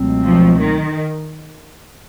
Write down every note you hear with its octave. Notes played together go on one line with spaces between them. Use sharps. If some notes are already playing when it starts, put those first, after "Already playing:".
Already playing: C#2 B2 F#3 A3 C4
F3
D#3